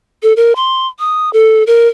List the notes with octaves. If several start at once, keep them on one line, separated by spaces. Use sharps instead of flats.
A4
A#4
C6
D#6
A4
A#4